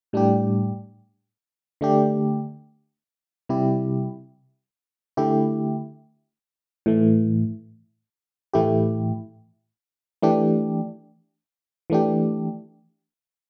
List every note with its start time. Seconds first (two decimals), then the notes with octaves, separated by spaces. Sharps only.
0.13 A2 G3 D4 G4
1.81 D3 A3 D4 G4
3.49 C3 G3 E4 G4
5.17 D3 A3 E4 G4
6.86 A2 E3 A3
8.53 A2 E3 A3 E4 G4
10.22 E3 A3 D4 G4
11.90 E3 A3 D4 G4